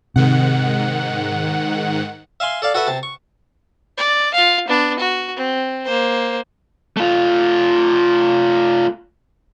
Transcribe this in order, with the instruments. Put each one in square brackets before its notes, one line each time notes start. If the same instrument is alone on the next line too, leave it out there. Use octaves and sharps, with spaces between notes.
[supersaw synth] G#2 D#3 F#5 [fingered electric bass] C3
[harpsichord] E5 F5 G#5 C6
A4 D5 F5
F#4 A4 B4 E5
C3 A5
C#6
[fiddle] D5
F4 F5
B3 D4
F#4
C4
A#3 C5
[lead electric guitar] A3 F4